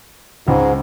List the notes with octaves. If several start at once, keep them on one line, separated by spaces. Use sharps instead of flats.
C#2 G#2